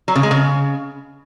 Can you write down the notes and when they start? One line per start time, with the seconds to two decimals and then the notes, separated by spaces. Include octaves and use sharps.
0.08 F#3
0.16 C#3
0.23 G#3
0.31 C#3